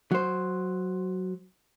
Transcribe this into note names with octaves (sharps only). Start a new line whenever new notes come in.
F#3 C5